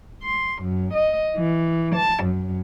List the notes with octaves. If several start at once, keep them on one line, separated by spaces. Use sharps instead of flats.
C6
F#2
D#5
E3
A5
F#2